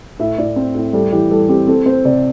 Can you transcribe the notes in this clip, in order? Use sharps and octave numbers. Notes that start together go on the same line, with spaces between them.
A2 E5
A2 D5
C4
A2
G3 A4
E3 G4
G3 A4
C4 G4
C4 A4
C4 C5
C3 D5